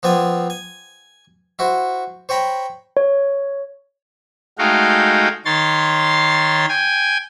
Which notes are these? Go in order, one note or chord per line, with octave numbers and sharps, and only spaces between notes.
F3 B3 C4 D5 G#5
G#5
E4 F#4 C5
C5 C#5 G5 A#5 B5
C#5
G#3 A3 D#4 F#4 F5 G5
D#3 C#5 C6 A6
G5 G#5